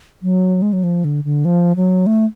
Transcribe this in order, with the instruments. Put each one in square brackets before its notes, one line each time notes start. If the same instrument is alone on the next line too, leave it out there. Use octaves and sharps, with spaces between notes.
[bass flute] F#3
G#3
F#3
F3
D3
D3
F3
F#3
A3